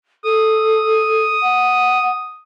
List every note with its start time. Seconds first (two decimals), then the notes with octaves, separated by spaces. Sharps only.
0.25 A4 D#6
1.42 F#5